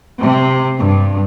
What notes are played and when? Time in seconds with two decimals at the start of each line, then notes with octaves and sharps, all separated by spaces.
0.20 C3
0.77 G2